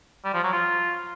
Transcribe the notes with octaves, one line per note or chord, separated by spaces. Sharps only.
G3
F3
F#3
F4